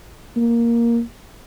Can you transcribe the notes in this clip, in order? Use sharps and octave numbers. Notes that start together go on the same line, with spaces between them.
A#3